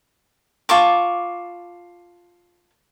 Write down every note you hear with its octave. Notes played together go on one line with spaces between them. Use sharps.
F4 A5 C#6 D6